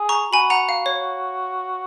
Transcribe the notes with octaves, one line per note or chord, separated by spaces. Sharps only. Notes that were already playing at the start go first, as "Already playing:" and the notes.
Already playing: G#4
A#5 C#6
F#4 G#5 B5
F#5 A#5
F5
C#5